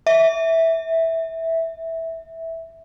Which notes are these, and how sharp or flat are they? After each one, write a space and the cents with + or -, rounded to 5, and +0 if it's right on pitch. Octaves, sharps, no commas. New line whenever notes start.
E5 -10